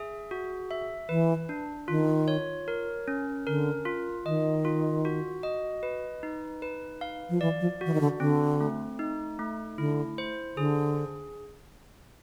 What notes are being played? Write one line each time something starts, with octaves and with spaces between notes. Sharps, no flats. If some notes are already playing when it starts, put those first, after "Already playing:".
Already playing: G#4 E5
F#4
E5
E3 B4
D4
D#3 F4
C#5
A#4
C#4
D3 A#4
F4
D#3 D#5
F4
F#4
D#5
B4
D#4
B4
F5
F3
E3 D5
F3
E3 F#4
D#3
D3
D3 C4
A3
D#4
A3
D3 E4
C5
D3 G#4